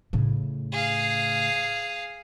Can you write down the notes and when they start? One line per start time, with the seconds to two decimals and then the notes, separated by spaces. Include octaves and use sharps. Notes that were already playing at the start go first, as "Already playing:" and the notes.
0.13 A2 C#3
0.72 G#4 F5